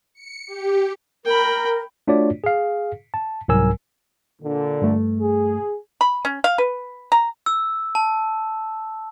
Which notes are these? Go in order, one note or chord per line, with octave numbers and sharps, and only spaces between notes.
C#7
G4
A#4 G5 B5
A3 D4 F4 F#4 C#5 D5
G#4 F5
A5
C2 G#2 F#3 A#4 G#5 E6
A#2 D3
G2 A3
G#4
B5
C#4
F5
B4
A#5
E6
A5